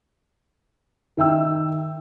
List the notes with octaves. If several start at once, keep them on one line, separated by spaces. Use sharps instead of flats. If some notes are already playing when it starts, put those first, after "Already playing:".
D#3 E5 G5 E6